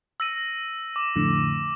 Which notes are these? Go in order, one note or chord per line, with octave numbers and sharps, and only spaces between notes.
E6 A#6 D#7
D6
F2 A2 D3